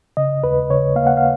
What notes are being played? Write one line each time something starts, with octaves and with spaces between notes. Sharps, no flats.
C#3 D#5
D#2 B4
C#3 C#5
A#3 F5
F#5
F5